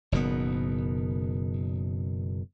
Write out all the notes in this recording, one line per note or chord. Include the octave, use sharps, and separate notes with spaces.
F#1 B2 D#3 B3